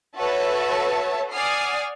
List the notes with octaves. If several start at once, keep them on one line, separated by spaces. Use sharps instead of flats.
F#4 A4 B4 C#5 E5 A5
D5 F#5 G#5 D#6 F6 C7